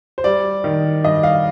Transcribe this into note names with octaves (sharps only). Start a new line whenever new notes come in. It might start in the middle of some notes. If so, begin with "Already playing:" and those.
C5
G3 D5
D#3
G2 D#5
F5